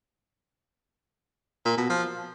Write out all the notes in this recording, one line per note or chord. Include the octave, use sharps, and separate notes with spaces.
A#2
B2
F3